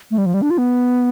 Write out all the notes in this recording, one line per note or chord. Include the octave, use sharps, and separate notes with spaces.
A3
G3
F3
G3
D4
F4
B3